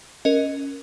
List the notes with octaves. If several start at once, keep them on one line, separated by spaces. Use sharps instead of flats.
C#4 A#4 D#5